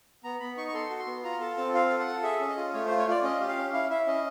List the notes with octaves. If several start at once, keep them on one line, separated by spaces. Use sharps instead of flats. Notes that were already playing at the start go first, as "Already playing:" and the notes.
B3 A#5
B3 B5
D#4 C#6
C#6
A4 C6
F#4
C6
B3
F4 A#5
A4 A5
C4 A5
F4 F5
A4
F#5
A4
G#4 E5
C#4
D#5
F4
A3 C#5
C5
F4
C#5
F4 D5
C#4 D#5
G4
F5
C#4
E4 F5
E4 E5
C#4 D#5